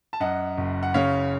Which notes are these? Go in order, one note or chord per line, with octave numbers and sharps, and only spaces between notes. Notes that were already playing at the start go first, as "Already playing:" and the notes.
A5
F#2 D#5 F#5
F#1
F#5
C#3 C#5 F5